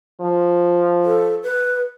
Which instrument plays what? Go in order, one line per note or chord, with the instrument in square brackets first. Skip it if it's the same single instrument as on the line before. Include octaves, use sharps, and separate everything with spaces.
[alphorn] F3
[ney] A4
B4